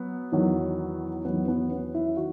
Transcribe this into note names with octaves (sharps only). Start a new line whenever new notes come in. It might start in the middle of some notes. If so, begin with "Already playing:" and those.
Already playing: F#3 B3
E2 D#3 F#3
E2 D#3 F#3 B3
B3
C#4
E4
D#3 F#4